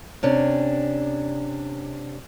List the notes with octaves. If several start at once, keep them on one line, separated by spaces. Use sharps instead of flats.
C3 C#4 D4